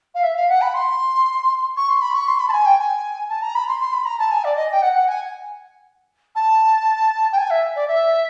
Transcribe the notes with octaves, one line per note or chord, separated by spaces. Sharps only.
F5
E5
F5
F#5
B5
C6
C#6
C6
B5
C#6
C6
B5
A5
G#5
G5
G#5
A5
A#5
B5
C6
C6
B5
A#5
A5
G#5
D5
D#5
G5
F#5
F#5
G#5
A5
G5
G#5
E5
D5
E5